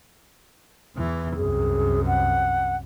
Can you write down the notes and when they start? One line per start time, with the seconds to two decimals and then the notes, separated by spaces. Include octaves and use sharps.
0.96 E2 E3
1.36 C2 F#2 G#4
2.07 F#5